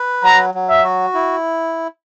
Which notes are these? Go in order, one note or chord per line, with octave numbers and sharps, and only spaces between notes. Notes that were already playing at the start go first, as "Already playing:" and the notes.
Already playing: B4
F#3 A#5
F#3
E5
F#4
E4